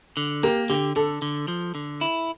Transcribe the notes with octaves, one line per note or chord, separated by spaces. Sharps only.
D3
A#3 G4 A#4
D3 G4
D3 A4
D3
F3
D3
E4